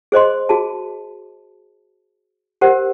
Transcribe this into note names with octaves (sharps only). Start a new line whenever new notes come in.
G#4 C5 D#5 C6
F#4 G#4 A5
G4 A#4 C5 F#5